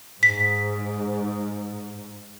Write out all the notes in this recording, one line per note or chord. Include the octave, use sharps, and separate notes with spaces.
G#2 B6